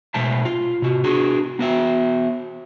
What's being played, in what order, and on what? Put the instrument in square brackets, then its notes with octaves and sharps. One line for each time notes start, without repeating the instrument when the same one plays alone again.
[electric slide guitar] B2 G#3 A3 C5 E5 A5
F4
C3 F#4
D4 F#4 G#4
B3 F#4 E5